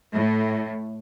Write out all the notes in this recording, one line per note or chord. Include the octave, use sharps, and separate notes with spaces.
A2